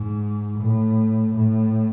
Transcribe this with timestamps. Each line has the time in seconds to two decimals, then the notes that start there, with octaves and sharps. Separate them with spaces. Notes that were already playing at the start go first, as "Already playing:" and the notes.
Already playing: G#2
0.58 A2
1.34 A2